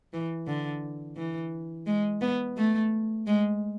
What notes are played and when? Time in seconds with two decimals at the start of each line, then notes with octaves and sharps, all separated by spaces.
0.13 E3
0.47 D3
1.16 E3
1.86 G#3
2.21 B3
2.57 A3
3.27 G#3